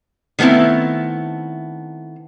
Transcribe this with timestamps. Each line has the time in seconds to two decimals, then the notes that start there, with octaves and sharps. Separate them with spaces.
0.39 D#3 A3 B3 C4 E4